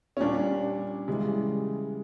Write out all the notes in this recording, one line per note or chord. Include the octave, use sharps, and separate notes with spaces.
C#4
A#2 G3 D4
C#3 E3 G3 G#3